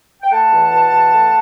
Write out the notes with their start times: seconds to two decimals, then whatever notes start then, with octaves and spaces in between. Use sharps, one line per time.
0.22 G5
0.31 A3 F#5 A5
0.51 E2
0.72 B2
0.92 E2
1.12 A3